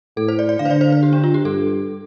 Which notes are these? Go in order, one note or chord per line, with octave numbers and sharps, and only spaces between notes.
A2 A4
C5
D5
D5
D3 F5
C5
D5
C5
C5
G4
D4
F4
G4
G2 A4